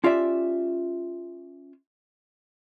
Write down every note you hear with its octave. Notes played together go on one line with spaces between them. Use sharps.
C#4 F4 G4 D5 E5